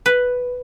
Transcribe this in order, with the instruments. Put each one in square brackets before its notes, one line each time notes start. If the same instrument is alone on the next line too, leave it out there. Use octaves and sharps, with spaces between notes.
[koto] B4